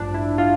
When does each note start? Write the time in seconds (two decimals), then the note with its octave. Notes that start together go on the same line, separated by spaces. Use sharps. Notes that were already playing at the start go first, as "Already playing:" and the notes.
Already playing: A1 G2 F3 D4
0.14 E4
0.38 F4